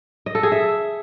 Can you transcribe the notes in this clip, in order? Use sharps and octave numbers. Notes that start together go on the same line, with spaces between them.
D#5
A4
G#4
E5